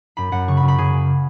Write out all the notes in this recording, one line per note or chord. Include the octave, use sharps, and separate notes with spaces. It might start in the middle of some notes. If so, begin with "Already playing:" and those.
F#2 B5
F#2 F#5
C#3 C#6
B5
F#2
B5
C#3 G#4
C#3